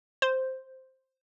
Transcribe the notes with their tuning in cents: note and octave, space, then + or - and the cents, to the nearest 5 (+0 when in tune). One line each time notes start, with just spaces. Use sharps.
C5 +0